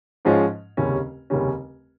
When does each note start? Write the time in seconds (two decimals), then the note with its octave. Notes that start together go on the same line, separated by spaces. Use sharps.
0.25 G#2 F3 G#3 C#4 F4
0.77 F1 D#2 C#3 G3 C#4
1.30 F1 D#2 C#3 G3 C#4